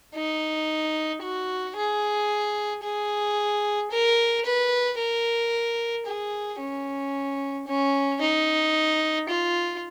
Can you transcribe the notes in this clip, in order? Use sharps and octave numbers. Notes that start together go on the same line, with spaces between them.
D#4
F#4
G#4
G#4
A#4
B4
A#4
G#4
C#4
C#4
D#4
F4